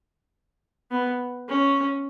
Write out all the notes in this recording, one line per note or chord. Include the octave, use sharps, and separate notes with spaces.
B3
C#4